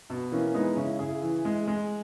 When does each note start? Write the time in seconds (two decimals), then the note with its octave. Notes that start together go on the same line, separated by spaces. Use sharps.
0.10 B2
0.32 E3 A#3 C#4
0.54 G#3 B3 D#4
0.77 C#3 C#4 E4
0.99 C#3 E4 G#4
1.22 E3
1.45 G#3
1.67 G#3